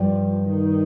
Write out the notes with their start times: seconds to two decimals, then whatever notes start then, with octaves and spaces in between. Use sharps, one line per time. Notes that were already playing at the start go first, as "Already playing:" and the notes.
Already playing: G2 F3
0.50 D#3